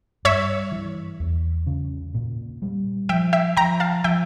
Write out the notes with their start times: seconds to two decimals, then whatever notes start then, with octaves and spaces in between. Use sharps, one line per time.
0.25 G2 C#5 E5
0.72 E3
1.20 E2
1.67 C#3
2.14 A#2
2.62 G3
3.09 F3 E5 G5
3.33 E5 G5
3.57 F3 G5 A#5
3.80 F5 A5
4.04 F3 E5 G5